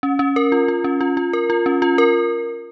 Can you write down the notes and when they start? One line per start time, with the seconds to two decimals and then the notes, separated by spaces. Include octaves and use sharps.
0.03 C#4
0.19 C#4
0.36 A#4
0.52 F4
0.68 F4
0.84 C#4
1.01 F4
1.17 F4
1.33 A#4
1.50 F4
1.66 C#4
1.82 F4
1.98 A#4